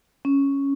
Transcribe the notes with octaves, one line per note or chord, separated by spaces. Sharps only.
C#4